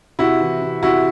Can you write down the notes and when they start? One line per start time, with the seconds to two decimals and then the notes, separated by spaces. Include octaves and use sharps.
0.19 C3 E4 F#4
0.41 E3
0.62 C3
0.83 C3 E4 F#4